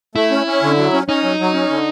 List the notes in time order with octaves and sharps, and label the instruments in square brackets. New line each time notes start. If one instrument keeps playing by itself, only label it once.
[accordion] A3 [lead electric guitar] E4
[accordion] C#4
C#4
D3
F#3
C#4
[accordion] C#4 [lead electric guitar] D#4
[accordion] F#3
F#3
C#4
D3